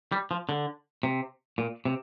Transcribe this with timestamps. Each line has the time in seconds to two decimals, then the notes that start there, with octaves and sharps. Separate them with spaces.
0.12 G3
0.31 F3
0.49 D3
1.03 C3
1.58 A#2
1.85 C3